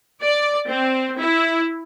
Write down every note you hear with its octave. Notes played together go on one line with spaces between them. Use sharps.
D5
C4
E4